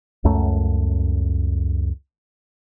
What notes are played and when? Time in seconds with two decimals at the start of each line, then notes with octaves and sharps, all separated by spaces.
0.24 C#2 F#2 A3